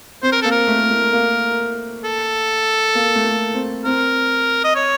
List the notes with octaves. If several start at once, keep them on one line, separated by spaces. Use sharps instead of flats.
C4 C5
A#4
A#3 A4
A#4
A3
A3
A#3
A4
A#3
A3
A#3
C4
C4 A#4
D#5
C#5